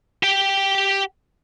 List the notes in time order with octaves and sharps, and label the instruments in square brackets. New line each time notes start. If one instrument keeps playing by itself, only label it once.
[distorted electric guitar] G4 G5